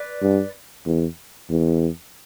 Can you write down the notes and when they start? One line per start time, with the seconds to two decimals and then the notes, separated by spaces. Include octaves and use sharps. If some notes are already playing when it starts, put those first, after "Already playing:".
Already playing: B4 D5
0.21 G2
0.86 E2
1.50 E2